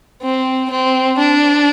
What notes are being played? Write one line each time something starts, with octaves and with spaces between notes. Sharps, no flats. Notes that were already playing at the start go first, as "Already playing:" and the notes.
C4
C4
D4